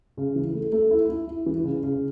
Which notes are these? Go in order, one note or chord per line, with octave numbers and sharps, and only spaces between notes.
C#3
E3
A3
A3
E4
E4
E4
E3
C#3
C#3